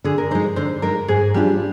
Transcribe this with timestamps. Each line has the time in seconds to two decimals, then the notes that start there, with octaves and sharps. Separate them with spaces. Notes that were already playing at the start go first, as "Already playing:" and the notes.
0.04 D3 G#4
0.18 A#4
0.31 G#3 D#4 C5
0.56 D3 C5
0.82 G#3 D#4 A#4
1.08 G#2 G#4
1.34 G3 D4 F4 G4